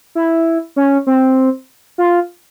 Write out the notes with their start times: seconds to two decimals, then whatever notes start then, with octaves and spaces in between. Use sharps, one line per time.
0.15 E4
0.76 C#4
1.07 C4
1.98 F4